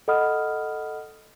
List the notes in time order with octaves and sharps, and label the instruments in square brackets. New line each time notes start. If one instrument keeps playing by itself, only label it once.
[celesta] A4 D#5 F#5 B5 D#6 F6